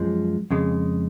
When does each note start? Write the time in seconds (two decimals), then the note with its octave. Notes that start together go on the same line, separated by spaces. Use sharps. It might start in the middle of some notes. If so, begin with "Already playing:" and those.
Already playing: F#2 F3 G#3
0.51 F2 C#3 G#3